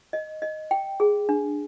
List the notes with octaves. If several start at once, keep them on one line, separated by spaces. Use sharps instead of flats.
D#5
D#5
G5
G#4
D4